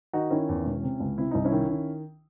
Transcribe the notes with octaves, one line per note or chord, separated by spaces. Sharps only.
D#3 D#4 F#4
D#3 C#4 E4
E2
E1
C3
C#2
C3 E4
C2 D#4
C#4 E4
D#3
D#3